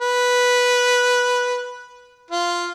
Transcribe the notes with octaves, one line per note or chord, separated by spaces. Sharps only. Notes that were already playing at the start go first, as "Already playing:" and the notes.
B4
F4